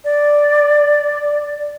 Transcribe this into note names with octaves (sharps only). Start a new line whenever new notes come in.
D5